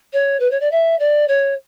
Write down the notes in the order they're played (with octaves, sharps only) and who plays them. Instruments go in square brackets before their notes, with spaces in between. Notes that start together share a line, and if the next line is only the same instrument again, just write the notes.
[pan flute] C#5
B4
C#5
D5
E5
D5
C#5